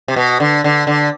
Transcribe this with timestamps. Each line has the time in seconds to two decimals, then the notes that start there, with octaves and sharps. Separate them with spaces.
0.08 C3
0.16 B2
0.40 D3
0.64 D3
0.87 D3